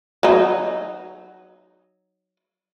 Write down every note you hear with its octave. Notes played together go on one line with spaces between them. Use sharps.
F#3 D#4